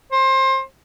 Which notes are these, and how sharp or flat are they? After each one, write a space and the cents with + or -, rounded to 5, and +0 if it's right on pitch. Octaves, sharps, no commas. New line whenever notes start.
C5 +25